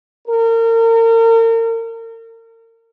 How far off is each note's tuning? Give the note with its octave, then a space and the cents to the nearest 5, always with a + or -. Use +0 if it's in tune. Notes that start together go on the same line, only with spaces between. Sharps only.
A#4 -35